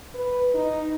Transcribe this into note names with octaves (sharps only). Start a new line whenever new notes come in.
B4
D#4